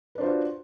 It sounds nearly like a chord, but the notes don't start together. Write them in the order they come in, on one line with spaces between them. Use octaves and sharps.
B4 D4 C5 F4 F#4